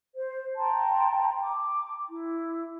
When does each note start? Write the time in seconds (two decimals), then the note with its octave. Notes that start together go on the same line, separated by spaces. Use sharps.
0.16 C5
0.57 G5 A5 A#5 C6
1.40 D6
2.09 E4